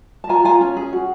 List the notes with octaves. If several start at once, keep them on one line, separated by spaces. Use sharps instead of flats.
A5
F4 G#5 A#5
F4 G#5 A#5
C#4
G#4
F#4